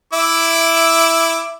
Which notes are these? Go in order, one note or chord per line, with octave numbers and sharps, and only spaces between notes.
E4 E5 D6